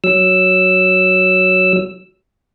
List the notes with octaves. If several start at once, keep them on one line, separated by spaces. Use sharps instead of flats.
F#3 E6